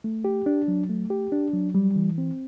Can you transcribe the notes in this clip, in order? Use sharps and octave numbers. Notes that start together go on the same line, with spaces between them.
A3
G4
D4
F#3
A3
G4
D4
F#3
G3
E3
C4